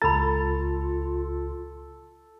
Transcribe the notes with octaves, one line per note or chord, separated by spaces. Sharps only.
C#2 F4 A4 A#5 B5 A6